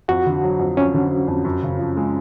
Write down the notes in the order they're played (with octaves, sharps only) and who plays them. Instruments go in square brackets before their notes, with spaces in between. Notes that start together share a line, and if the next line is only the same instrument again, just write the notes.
[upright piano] F2 [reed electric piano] F#4
[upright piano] D3
F#3
F2
[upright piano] F2 [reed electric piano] C#4
[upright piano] D3
F#3
F2
F#2
C#3
F3
G#3